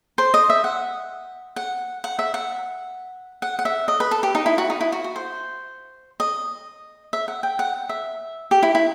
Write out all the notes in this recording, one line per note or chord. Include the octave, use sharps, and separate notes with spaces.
C5
D#5
E5
F#5
F#5
F#5
E5
F#5
F#5
F#5
E5
D#5
B4
A4
G4
D#4
E4
F#4
D#4
E4
F#4
F#4
C5
D#5
E5
F#5
G5
F#5
E5
G4
E4
E4